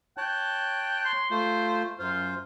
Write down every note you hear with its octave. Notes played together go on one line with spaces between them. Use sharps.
C#5 G5 A5 F#6
C6
A3 F4 C5
F#2 F4 C5